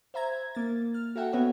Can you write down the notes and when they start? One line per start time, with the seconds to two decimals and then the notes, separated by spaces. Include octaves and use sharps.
0.14 C5 E5 A#5 G#6
0.55 A#3 A6
0.94 F6
1.16 F#4 A4 E5 F#5 G5
1.32 B3 F#4 B4 C#5 E5 F#5